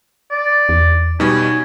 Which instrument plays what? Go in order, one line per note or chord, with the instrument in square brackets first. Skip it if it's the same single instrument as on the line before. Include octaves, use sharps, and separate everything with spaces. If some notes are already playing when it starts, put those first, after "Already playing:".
[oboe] D5
[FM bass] E2
[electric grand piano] B2 G3 [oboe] C#4 [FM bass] D#4